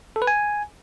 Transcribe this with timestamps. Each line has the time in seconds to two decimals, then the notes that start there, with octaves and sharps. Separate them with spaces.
0.16 A4
0.22 B4
0.27 G#5